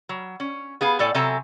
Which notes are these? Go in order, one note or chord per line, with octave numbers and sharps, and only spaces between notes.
F#3
C#4
B3 G#4 F5
A2 A4 D5 G#5
C3 F#3 A4 E5 G#5 A#5